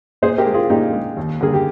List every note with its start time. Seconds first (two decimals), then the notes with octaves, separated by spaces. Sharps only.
0.22 A#2 G#4 C5
0.38 G4 A#4
0.46 G#3
0.54 F4 G#4
0.70 A#2 D#4 G4
0.93 G#3
1.17 D#2
1.41 D3 G3 A#3 G#4
1.54 G4